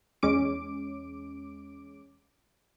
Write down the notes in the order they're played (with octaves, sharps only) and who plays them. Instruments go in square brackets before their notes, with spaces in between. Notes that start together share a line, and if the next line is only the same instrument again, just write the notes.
[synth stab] E2 G#3 C#4 D6 D7